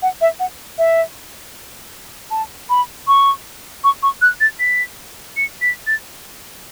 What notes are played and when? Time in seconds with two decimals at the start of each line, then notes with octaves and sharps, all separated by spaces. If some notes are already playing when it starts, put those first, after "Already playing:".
0.02 F#5
0.21 E5
0.40 F#5
0.78 E5
2.31 A5
2.70 B5
3.08 C#6
3.84 C#6
4.03 C#6
4.22 F#6
4.41 A6
4.60 B6
5.37 C#7
5.62 B6
5.87 A6